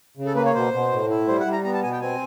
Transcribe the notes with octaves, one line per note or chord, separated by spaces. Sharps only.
C#3
A4
A#3 B4
C#5
B2 C5
B2
A2
E4
G3 C5
F#5
G3
A#5
B3 A#5
A5
B2 G#5
G5
C4 G#5